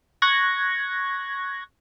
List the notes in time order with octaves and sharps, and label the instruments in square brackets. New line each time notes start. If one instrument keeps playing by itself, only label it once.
[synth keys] C#6 F#6 G#6 A#6